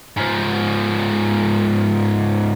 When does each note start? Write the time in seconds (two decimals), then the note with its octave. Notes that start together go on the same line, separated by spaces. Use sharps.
0.17 G#2 F3